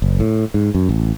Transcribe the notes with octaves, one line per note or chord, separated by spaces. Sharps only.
F#1
A2
G#2
F#2
A1